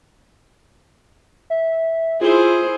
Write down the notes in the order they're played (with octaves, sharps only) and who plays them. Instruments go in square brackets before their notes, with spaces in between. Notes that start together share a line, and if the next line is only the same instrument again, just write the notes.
[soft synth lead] E5
[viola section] E4 G#4 C5 [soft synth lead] F4